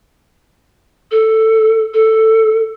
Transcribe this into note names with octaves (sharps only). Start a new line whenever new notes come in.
A4
A4